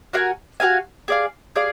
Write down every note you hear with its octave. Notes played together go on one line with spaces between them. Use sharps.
F#4 A#4 F5 G#5
F#4 A#4 F5 G#5
G#4 D5 F5
G#4 D5 F5